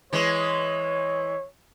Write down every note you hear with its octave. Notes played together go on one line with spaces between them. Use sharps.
E3 G#3 C#5